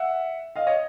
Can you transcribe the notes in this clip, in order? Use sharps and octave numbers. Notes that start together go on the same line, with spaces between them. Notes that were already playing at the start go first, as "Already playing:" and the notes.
Already playing: E5 F#5
D#5 F5
C#5 D#5